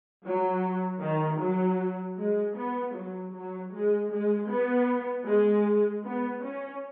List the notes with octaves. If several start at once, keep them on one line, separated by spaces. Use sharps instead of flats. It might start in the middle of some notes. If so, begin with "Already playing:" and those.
F#3
D#3
F#3
G#3
B3
F#3
F#3
G#3
G#3
B3
G#3
B3
C#4